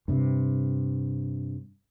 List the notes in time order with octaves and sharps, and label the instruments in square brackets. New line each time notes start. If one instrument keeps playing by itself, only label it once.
[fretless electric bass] G2 C3